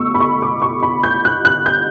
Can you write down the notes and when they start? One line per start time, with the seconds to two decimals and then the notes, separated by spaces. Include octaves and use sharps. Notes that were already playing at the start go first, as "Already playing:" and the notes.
Already playing: B2 A3 C#6 E6
0.14 B5
0.20 C#6
0.42 D6
0.62 C#6
0.83 B5
1.03 G6
1.25 F#6
1.45 F#6
1.66 G6